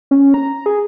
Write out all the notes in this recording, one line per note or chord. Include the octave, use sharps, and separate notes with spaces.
C#4
A#5
G#4